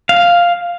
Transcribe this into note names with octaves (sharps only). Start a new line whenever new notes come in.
F5